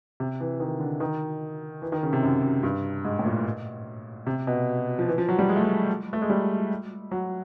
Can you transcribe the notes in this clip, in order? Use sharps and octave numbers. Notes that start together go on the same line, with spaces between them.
C3
E3
D#3
D3
D#3
E3
D#3
C#3
C3
F#2
F#2
G2
G#2
A2
A#2
C3
B2
F3
E3
F3
F#3
G3
G#3
A3
G#3
A3
G#3
G3
F#3